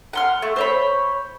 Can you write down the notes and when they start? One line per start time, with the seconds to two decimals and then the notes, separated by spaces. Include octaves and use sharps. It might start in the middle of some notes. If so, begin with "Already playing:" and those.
0.13 F#5 C6 F6
0.42 A3
0.56 C5 C#5 B5